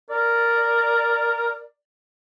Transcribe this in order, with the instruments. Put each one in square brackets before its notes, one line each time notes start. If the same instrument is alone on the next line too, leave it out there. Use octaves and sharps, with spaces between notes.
[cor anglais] A#4 [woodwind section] D5